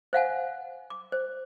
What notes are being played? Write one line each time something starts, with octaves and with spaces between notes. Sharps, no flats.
C5 F5 F#5 G#5
D6
C5